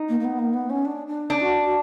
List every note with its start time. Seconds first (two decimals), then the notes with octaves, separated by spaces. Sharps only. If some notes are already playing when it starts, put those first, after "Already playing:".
Already playing: D#4
0.09 A#3
0.19 A#3
0.24 B3
0.39 A#3
0.53 B3
0.70 C#4
0.85 D4
1.07 D4
1.30 C#4 D4
1.41 F#4
1.65 F#4